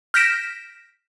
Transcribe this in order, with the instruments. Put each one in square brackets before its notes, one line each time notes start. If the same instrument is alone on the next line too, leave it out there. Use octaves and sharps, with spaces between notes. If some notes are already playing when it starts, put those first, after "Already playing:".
[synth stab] F6 G6 A#6 B6 D7 E7